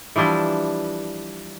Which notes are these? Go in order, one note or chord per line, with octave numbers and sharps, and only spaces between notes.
E3 F3 G3 D4 E4